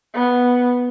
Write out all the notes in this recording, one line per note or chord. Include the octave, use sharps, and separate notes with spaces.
B3